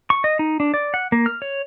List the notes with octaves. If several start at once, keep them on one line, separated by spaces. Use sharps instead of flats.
C#6
D#5
D#4
D4
D5
F#5
A#3
F6
C#5